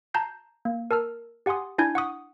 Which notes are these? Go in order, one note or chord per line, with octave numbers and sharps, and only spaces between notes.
A5 A#5 G6 C7
A#3
A#4 A5 E6 F6
G4 F#5 G#5 C6 D#6
D4 E4 G#5 G6 G#6
F#5 C#6 D#6